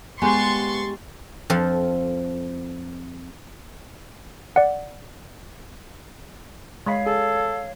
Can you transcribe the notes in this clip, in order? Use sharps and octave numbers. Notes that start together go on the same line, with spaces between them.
G#2 G#3 B3 G4 G#5 C6 C#6 A6
F2 F3 A4
D5 F#5
G#3 C#5 D#5 F5 B5
G#4 A4